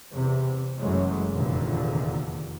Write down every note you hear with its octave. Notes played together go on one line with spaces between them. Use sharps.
E2 C3
F#1 F#2 E3 F#3 G#3 A3
F1 E2 A#2 D3 D#3